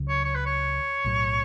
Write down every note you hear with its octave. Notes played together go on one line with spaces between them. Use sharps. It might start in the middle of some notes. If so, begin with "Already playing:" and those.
Already playing: C#2 C#3 F#3
C#5
C#5
B4
C#5
B1 A2 F#3